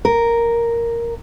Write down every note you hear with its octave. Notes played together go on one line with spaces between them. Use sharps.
A#4